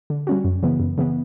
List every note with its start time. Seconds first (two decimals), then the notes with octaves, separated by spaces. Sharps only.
0.10 D3
0.27 G3 C#4 F#4
0.44 F#2
0.63 C#3 E3 B3
0.80 F#2
0.98 C#3 E3 B3